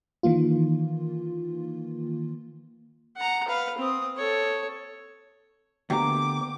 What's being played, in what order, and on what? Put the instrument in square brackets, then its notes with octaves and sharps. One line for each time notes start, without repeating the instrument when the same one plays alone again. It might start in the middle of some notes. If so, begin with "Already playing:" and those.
[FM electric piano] D#3 E3 A#3 F4
[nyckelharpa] F#5 A#5
B4 F5
C4 D#6
A4 C#5
[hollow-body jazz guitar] D2 [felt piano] A#3 B3 [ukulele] G4 A#5 [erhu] D6